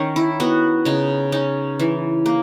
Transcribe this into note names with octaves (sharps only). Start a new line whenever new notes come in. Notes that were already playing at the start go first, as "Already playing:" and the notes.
Already playing: D#3 C#4
E4
B3 F#4
C#3 D#4
C#4 D#4
E3
A#3